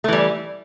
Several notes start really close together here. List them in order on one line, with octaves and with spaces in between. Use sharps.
A3 E3 G3